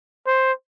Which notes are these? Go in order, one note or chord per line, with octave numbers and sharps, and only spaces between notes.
C5